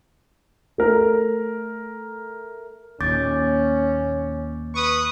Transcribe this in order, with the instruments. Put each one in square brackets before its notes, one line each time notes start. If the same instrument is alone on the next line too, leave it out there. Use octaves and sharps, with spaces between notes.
[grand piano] A3 A#4
[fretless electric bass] D#2 A#2 [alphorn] C#4 [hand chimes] D6 G6 A6
[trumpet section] B4 C#6 D#6